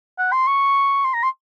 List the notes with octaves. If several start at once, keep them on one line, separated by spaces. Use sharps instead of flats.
F#5
C6
C#6
C6
A#5
C6